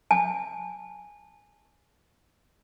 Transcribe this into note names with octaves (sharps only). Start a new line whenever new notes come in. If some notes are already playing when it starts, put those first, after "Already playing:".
G#5 A5